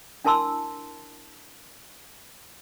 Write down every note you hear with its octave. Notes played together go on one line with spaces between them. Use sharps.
D4 E4 A#4 A5 C6 E6